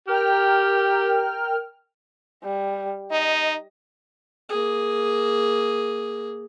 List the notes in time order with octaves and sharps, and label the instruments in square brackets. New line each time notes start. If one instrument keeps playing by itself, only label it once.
[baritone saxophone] G4 [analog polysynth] A#4 G5 F6
[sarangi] G3
[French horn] D#4 [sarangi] D#5
[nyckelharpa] A#3 G#4